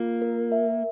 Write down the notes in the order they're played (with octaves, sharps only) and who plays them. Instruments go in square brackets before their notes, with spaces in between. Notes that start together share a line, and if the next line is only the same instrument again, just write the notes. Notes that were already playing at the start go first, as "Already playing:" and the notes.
Already playing: [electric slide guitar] A#3 [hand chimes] F4
[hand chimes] A#4
E5